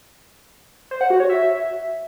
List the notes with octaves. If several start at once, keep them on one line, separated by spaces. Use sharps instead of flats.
C5
F#5
F#4
C#5
E5